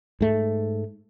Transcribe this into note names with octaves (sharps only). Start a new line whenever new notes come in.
G#2 A3